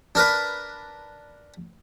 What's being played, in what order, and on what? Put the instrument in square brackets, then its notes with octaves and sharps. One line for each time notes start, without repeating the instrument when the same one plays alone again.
[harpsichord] D4 A#4 B4